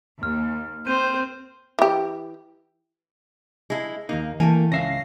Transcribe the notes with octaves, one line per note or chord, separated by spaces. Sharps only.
D#2 F6
C4 C5 G6 D#7
E3 G4
G#3 E4
D#2 A#3 D#4
E3 A3 A#3 G5 G#5
C#2 C#4 E5 F5 A#6 C7